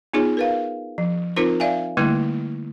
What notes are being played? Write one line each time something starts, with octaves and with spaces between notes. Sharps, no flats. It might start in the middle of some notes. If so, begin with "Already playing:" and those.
B3 D#4 F4 G#4 C#5
A#4 B4 F5
F3
C4 D#4 F4 A#4 C5
D5 E5 F5 G#5
D3 G3 A3 A#3 E4